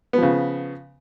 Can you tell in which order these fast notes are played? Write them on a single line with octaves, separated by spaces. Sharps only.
B3 F3 C#3